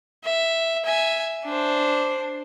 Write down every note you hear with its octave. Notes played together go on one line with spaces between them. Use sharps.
E5
E5 G#5
D4 C5